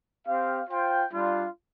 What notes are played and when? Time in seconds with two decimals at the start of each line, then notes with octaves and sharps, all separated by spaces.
0.27 C4 G4 F5
0.70 F4 C5 G5
1.13 G3 D4 F4